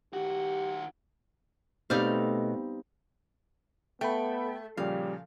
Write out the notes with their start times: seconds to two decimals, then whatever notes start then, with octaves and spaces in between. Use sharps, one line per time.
0.13 D#3 F#4 G4
1.90 B2 G3 A3 C4 D#4 F5
4.01 A3 B3 G5 B5
4.77 A#2 C#3 F3 G3 F5